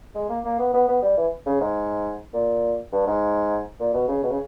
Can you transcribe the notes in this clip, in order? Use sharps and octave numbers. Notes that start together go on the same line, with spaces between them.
G#3
A#3
A#3
B3
B3
B3
G3
E3
C#3
G#2
A#2
G2
G#2
A#2
B2
C#3
B2
C#3